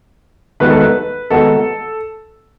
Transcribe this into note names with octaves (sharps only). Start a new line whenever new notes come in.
D#3 G#3 B3 D#4 F#4 B4
A4
B4
D#3 G#3 B3 D#4 F#4 A4